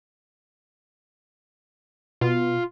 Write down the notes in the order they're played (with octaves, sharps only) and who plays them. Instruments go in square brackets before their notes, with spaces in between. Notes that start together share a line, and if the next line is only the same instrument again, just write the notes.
[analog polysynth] B2 [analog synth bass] F4